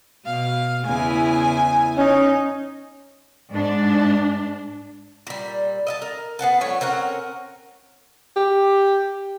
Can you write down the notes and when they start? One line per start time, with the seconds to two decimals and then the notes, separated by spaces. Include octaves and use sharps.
0.26 B2 F5
0.86 E2 C#3 E4 G#5
1.98 C#4 D#4
3.52 G#2 D4
5.27 A#2 G3
5.87 D#5 E5 A5
6.02 A#4
6.39 B3 G#4 F#5 A5
6.61 F3 G3 A3 C#5
6.81 C4 C#4 A#4 F#5
8.36 G4